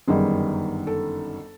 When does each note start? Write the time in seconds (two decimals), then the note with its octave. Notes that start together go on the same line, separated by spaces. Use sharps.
0.08 G1 F#2 D#3 G3 G#4
0.87 A4